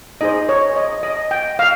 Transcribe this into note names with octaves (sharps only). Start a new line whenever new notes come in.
D#4 G#4 C5 D#5
C#5
D#5
D#5
G5
F5